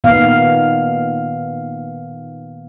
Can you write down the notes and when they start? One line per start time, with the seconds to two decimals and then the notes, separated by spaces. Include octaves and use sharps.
0.04 A#2 D#3 B3 F5